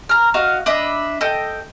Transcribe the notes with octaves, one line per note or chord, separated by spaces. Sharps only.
A#5 F6
F#4 D#5 F5
D4 D#5 E5 B5
A4 D#5 G5